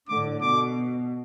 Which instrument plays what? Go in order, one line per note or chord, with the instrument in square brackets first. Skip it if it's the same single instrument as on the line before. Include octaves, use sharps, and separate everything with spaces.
[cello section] A2 D3 [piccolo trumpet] D6
[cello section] B2 [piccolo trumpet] D6